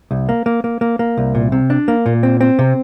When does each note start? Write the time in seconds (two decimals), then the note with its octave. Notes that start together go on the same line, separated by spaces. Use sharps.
0.11 C2
0.29 A#3
0.46 A#3
0.64 A#3
0.81 A#3
0.99 A#3
1.17 C2
1.35 A#2
1.52 C3
1.70 D4
1.88 A#3
2.06 A#2
2.23 C4
2.41 C4
2.59 C3